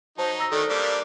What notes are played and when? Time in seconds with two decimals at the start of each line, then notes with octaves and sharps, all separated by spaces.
0.18 F#3 D#4 C5 A5
0.39 A#5 E6 A#6
0.52 D#3 A3 D4 A4
0.69 G3 A#3 D4